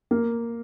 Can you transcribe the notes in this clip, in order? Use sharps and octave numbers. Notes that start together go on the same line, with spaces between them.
A#3